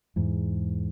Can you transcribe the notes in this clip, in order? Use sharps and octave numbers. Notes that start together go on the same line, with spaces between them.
E2 G#2